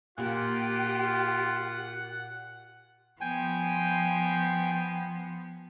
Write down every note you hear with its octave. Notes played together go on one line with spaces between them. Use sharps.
A#2 F4 G4 F#5
F3 B3 G5 G#5